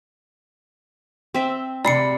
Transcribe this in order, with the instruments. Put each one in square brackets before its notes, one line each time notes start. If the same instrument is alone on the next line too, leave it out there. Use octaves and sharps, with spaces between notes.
[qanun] C4 E5
[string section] C3 [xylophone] D5 C7 C#7 [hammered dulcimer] B5